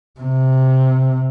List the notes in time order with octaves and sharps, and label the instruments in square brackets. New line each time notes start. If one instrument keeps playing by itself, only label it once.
[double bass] C3